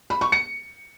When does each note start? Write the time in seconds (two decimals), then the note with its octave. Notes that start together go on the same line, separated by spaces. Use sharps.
0.10 B5
0.21 C#6
0.32 C#7